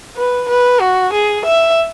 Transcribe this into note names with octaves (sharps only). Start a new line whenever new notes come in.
B4
B4
F#4
G#4
E5